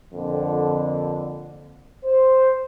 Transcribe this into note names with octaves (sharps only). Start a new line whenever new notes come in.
F2 A#2 D3
C5